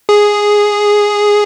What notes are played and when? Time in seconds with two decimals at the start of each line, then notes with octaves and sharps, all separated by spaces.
0.09 G#4